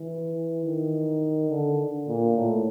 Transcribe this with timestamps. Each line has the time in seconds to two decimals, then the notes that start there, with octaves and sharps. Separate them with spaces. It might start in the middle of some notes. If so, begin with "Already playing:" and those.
Already playing: E3
0.65 D#3
1.50 D3
2.07 A#2
2.36 A2